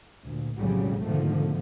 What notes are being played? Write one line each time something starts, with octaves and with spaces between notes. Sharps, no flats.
D2 A#2
B1 F2 A2 C#3 F#3 G3
G#2 B2 D3 D#3 F3 A3